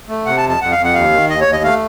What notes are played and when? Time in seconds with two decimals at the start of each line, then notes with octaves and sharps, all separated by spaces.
0.08 A3
0.26 C3 F#5
0.37 A5
0.44 F2
0.49 A5
0.61 F2 F#5
0.72 F5
0.78 F2
0.84 F#5
0.94 D#2 F5
1.12 D#3
1.30 D#2 D#5
1.41 C#5
1.47 D#2
1.52 D#5
1.63 A3 F5